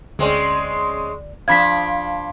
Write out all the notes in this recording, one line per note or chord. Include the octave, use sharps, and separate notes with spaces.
D2 G#3 C4 C#4 D5
F3 D4 F5 B5 G#6 B6